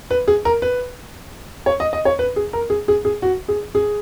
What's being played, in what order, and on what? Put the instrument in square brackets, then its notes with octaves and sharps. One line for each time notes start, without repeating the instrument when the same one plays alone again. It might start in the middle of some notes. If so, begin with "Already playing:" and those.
[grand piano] B4
G#4
A#4
B4
C#5
D#5
D#5
C#5
B4
G#4
A#4
G#4
G#4
G#4
F#4
G#4
G#4